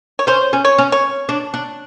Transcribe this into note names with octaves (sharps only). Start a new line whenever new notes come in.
C#5
C#4 C5
C#4
C#5
C#4
C#5
D4
D4